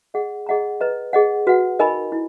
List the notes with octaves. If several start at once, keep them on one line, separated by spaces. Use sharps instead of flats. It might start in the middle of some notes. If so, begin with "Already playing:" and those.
G#4 D#5 F#5
G#4 D#5 F#5 A#5
B4 D#5 A#5
G#4 D#5 F#5
F#4 B4 F#5
D#4 A#4 D#5 G#5 B5
E4